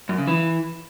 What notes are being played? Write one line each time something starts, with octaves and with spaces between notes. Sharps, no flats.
F#2
C#3
E3